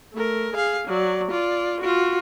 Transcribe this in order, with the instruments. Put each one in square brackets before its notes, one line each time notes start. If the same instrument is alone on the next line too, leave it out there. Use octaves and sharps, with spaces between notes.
[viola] A3 A#4
G#4 F5
F#3 D5
F4 D5
F4 F#4